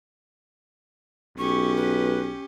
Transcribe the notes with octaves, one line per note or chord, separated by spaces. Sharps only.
B1 C#4 G4 C#6
B4